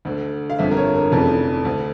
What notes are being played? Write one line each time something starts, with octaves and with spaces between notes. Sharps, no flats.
D2 D3
F5
G1 F2 D3 E5
A#4
C#5
A#4
F1 F2 C#3 E3 A4
D2 D3